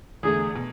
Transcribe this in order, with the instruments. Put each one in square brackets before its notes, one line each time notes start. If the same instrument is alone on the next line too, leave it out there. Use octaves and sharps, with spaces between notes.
[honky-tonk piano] E2 D3 A3 [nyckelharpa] G#4
[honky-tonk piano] B2